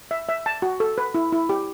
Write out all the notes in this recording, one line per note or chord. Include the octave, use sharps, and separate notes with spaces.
E5
E5
A5
F#4
A4
B4
E4
E4
G4